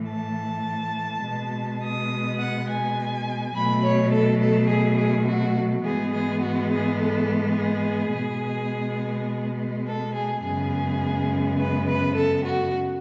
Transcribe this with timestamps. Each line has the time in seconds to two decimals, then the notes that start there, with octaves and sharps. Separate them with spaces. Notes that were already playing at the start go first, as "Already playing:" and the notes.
Already playing: A2 E3 A3
0.11 A5
1.26 B2 G#3 B3
1.83 D#6
2.40 F#5
2.70 G#5
3.55 B2 F#3 A3 B5
3.84 C#5
4.13 A4
4.42 A4
4.70 G#4
4.99 G#4
5.27 F#4
5.85 G#2 E3 G#3 B3 G#4
6.13 G#4
6.42 F#4
6.71 G#4
7.00 A4
7.58 G#4
8.15 B2 G#3 B3
9.87 A4
10.15 G#4
10.43 F#2 C#3 G#3 B3 G#4
11.59 B4
11.88 B4
12.16 A4
12.44 F#4